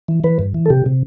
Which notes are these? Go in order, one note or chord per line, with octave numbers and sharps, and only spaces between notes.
E3
E3 B4
G2
E3
A4
C3 G4
C3